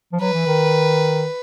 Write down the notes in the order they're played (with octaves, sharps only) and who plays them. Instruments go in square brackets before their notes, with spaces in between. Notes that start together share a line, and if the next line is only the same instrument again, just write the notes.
[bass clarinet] F3
[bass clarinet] F#3 [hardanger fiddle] B4
[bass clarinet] E3
D#3